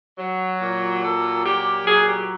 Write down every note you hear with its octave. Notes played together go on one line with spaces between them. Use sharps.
F#3
A#2
F#3 A4
A#2 G4
F#3 G#4
G4